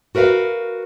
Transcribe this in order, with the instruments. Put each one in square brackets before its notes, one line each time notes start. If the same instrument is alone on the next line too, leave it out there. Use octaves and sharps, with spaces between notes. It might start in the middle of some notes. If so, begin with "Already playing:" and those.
[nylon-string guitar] F#4 A#4 B4 E5 F5